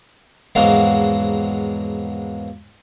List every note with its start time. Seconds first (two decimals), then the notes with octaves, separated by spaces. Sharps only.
0.55 E2 G#2 F3 F#3 G#3 A#3